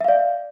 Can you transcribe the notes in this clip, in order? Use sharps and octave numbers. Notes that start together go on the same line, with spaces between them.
D5 E5 F5